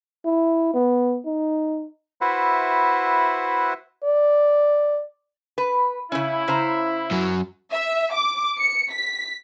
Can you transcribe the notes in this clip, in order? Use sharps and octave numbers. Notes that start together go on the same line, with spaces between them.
E4
B3
D#4
E4 F#4 B4 C5 E5 F#5
D5
B4
C#3 C#4 E4
C#3 C5 A#5
F#2 F#3
E5
D6
C#7
B6